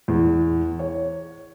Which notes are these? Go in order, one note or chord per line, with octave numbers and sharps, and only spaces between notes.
E2
C#5